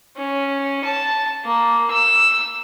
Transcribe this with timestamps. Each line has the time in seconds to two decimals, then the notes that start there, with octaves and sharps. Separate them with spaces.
0.17 C#4
0.84 A5
1.44 A#3
1.90 E6